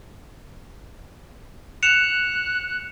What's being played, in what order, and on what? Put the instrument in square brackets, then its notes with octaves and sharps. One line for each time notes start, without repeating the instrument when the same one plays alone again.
[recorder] F#6 [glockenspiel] C#7 E7 F7